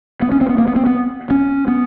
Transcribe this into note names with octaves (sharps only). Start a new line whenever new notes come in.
B3
C#4
C4
B3
A#3
B3
C4
B3
C#4
B3